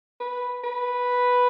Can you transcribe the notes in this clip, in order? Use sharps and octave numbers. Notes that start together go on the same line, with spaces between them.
B4
B4